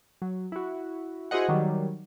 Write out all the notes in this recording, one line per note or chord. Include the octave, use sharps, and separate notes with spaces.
F#3
E4 F#4
E4 F#4 G#4 C5 D#5 F#5
D#3 F#3 G3